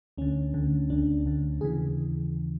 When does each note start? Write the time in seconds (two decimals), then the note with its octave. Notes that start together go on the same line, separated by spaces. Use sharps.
0.18 D2 D3 C#4
0.54 D2 D3
0.90 D2 D3 D4
1.26 D2 D3
1.61 D#2 C#3 E3 G#4